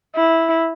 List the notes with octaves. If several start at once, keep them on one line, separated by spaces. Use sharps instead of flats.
E4